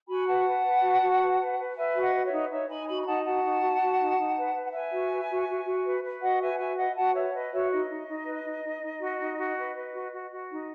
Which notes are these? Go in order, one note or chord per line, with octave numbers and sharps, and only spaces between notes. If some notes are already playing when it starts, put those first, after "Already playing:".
F#4 G#5 B5
B4 F#5 A5
B4
B4
F#4
F#4
B4
B4
B4
B4 E5 G#5
F#4
D#5 F#5
B4
C#5 E5
D#4
D#4 C#5 E5
D#4 G#5 B5
F#4 G#5 B5
B5
D#4 F#5 A5
F#4 F#5 A5
D#4
F#4
F#4
D#4
D#4
B4
B4
F#5
B4 E5 G#5
F#4
B4
F#4
F#4
F#4
B4
B4
F#4 D#5 F#5
B4 E5 G#5
F#4 E5 G#5
B4 D#5 F#5
F#4 F#5 A5
B4 C#5 E5
B4 D#5
F#4 C#5 E5
D#4 D#5
D#4
D#4
B4
D#4
D#4
D#4
F#4
D#4
F#4
B4
B4
F#4
F#4
F#4
D#4